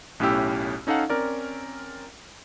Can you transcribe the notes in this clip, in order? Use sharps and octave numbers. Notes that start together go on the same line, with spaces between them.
B1 A2 C#4 E4 G4 E6
C#4 D#4 A4 F5 F#5
C4 C#4 A#4 D5